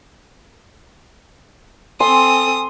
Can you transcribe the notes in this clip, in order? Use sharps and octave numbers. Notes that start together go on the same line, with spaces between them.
C4 A4 G#5 C6 D#6